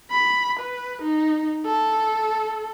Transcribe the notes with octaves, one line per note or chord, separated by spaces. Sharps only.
B5
B4
D#4
A4